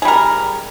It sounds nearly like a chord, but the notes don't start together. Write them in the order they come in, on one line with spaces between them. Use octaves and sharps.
G#4 G3 A#4